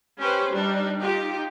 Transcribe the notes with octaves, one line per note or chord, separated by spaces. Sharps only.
C#4 G4 B4 C5
G3 D4 D#4
D#4 F4 G4